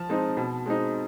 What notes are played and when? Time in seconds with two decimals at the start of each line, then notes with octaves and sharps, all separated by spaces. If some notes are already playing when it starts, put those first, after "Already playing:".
Already playing: F3 A5
0.09 G#3 C4 D#4
0.37 B2
0.66 G#3 C4 D#4